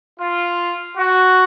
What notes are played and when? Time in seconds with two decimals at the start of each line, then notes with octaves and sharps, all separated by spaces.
0.20 F4
0.97 F#4